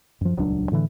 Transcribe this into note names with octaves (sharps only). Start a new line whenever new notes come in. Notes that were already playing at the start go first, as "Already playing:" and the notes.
F#2 F3
D#1 C#2 F#3 D4
A2 D3 E3